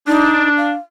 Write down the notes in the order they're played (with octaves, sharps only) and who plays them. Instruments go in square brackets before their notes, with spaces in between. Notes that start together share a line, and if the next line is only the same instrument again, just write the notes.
[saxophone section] D4 [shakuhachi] D#4
[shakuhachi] F5